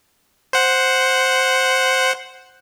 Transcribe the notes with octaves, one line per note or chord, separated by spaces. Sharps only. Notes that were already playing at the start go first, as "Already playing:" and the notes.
C5 F#5